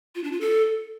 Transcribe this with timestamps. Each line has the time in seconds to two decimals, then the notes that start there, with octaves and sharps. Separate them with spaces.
0.15 F4
0.24 D4
0.32 F4
0.41 A4